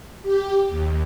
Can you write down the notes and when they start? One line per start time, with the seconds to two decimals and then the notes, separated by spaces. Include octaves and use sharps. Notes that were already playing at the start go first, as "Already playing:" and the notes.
0.22 G4
0.68 D#2